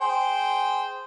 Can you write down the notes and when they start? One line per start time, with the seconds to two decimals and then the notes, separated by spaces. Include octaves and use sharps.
0.01 G#4 C5 G5